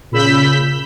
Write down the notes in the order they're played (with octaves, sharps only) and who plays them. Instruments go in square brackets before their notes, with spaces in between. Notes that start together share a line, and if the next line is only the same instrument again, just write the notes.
[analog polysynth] A#2 C#3 B5 E6 G6 B6